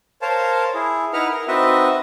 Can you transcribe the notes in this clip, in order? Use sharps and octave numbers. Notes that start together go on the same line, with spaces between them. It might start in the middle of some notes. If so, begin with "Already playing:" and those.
A#4 C5 C#5 F5 A5
E4 G#4
D#4 E4 B4 F#5 A#5 F6
A#4
C4 D#4 F#4 B4 D#5 E5